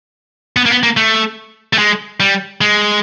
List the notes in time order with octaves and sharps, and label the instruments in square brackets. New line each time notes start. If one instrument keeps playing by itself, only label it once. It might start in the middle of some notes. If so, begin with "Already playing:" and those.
[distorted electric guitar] B3
A#3
B3
A#3
A3
A3
G#3
G3
G#3